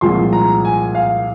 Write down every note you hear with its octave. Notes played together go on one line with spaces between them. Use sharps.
C2 A#2 F3 G#3 C6
A#5
G#5
F5